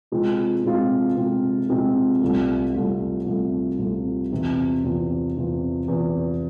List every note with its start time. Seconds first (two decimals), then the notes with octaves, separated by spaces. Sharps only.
0.12 C3 F3 G#3 C4 F4
0.64 C3 F3 G#3 C4 F4
1.17 C3 F3 G#3 C4 F4
1.69 C3 F3 G#3 C4 F4
2.21 C2 C3 F3 A3
2.74 C2 C3 F3 A3
3.26 C2 C3 F3 A3
3.79 C2 C3 F3 A3
4.32 E2 C3 F3
4.84 E2 C3 F3
5.36 E2 C3 F3
5.88 E2 C3 F3